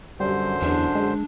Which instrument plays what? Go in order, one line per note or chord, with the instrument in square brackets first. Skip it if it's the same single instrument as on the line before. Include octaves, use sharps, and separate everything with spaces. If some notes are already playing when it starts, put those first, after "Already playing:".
[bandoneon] F#2 D3 C5 [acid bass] G3
[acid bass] E2 [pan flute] D4
[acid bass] G#3